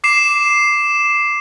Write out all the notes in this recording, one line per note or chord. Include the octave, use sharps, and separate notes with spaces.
D6 C7 E7